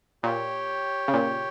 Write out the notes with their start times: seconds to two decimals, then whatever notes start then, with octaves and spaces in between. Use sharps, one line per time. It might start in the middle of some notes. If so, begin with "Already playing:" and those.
0.23 A#2 G4 C#5 G5
1.08 C#3
1.14 A#2